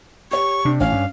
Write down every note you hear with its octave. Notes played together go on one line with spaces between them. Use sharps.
G4 C#5 C#6
C3 D4
A1 C#4 F5
G2